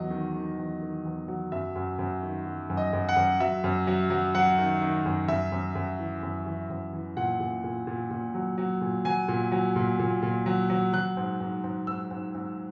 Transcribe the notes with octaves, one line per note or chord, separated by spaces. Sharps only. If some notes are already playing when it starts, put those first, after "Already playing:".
Already playing: E2 F#3 D#5
D#3
D#3
E2
D#3
E2
F#3
F#2 E5
F#2
F#2
D#3
F#3
F#2
D#5
F#2
F#5
F#2
F#3 E5
F#2
F#3
F#3
F#3 F#5
D#3
D#3
F#2
F#2 E5
F#2
F#2
E3
F#2
E3
F#2
E3
A#2 F#5
A#2
A#2
A#2
A#2
F#3
F#3
A#2
F#3 G#5
A#2
F#3
A#2
A#2
A#2
F#3
F#3
F#3 F#6
G#2
G#2
G#2
G#2 E6
G#2
G#2